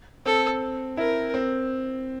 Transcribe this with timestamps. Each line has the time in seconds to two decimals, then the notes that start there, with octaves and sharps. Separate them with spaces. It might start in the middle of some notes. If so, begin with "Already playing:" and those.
0.26 C4 A4
0.97 E4 A#4
1.34 C4